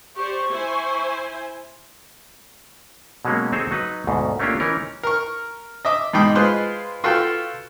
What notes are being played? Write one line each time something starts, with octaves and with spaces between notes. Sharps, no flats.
G4 C5 D5 C#6
E4 C5 G#5
B2 F#3 G#3 A#3 C#4
C4 D#4 G#4 A4 C5 C#5
F#3 D#4 B4
D2 G#2 B2
A3 A#3 C#4 D4 F4 G4
E3 C#4 D#4 A#4
A#4 C#6
D#5 E5 D6
G#2 B2 D#4 G5 B5 D6
G#3 F4 B4 C5 C6
F4 F#4 A4 B4 G5